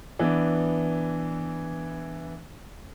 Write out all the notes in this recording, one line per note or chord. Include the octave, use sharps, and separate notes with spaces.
E3 B3 D4